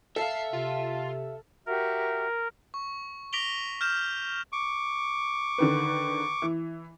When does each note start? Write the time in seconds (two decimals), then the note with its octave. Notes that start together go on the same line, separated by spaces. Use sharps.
0.16 A4 E5 F5 C7
0.53 C3 F4
1.67 F#4 G4 A#4 E5
2.74 C#6
3.33 D6 A#6 B6 D7 F7 G7
3.81 F6 G6 E7
4.52 C#6 D6
5.58 D3 D#3 B4
6.42 E3